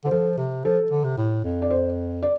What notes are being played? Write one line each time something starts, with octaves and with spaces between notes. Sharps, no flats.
D3 C5
F3 A4
C3
F3 A4
D3
C3
A2
F2
D5
C5
D5